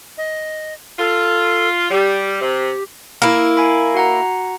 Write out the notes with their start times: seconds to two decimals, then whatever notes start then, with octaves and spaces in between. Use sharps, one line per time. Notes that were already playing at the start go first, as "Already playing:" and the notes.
0.18 D#5
0.99 F4 A4
1.90 G3 G4
2.41 C3
3.22 A#3 E4 F6 D7
3.57 G#5 B5
3.95 F#4 F#5 A#5